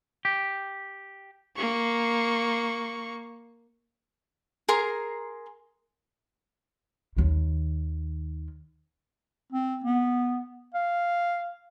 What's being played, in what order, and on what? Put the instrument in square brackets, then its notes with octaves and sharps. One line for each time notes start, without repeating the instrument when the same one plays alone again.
[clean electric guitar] G4
[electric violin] A#3 C#6
[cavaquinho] G#4 A#4 A#5 C6
[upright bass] D#2 D#3
[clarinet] C4
B3
F5